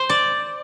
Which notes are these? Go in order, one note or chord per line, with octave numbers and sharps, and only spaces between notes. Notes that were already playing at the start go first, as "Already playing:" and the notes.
Already playing: C5
D5